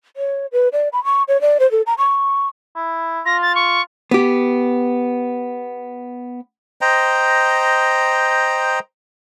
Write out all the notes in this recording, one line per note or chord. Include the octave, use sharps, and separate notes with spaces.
C#5
B4
D5
B5
C#6
C#5
D5
C5
A4
A#5
C#6
E4
F4 A#6
A6
C#6
B3 G4
C5 D#5 G5 A#5